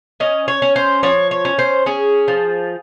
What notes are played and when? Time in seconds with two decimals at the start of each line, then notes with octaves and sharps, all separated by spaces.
0.20 C#4 D#5
0.48 C#5
0.62 C#4
0.76 C5
1.03 F3 C#5
1.31 C#5
1.45 C#4
1.59 C5
1.86 C#4 G#4
2.28 F3